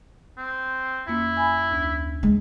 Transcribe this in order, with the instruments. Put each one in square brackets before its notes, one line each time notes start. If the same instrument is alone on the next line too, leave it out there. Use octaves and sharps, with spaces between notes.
[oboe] C4
[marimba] F2 A#3 C#4 [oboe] E4
[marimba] G#5 B5
D2 C#4
[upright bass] G#3